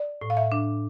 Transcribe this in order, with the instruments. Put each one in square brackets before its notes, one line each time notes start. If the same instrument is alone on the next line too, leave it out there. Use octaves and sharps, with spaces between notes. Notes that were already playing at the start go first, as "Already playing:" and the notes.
Already playing: [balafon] D5
[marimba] A2
[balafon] F5
E5
[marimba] D4